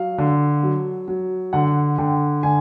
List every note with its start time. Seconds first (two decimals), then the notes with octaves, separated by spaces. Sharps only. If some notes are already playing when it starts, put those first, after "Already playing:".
Already playing: F#3 F5
0.18 D3
0.63 F#3
1.08 F#3
1.53 D3 F#5
1.98 D3 G5
2.43 D3 G#5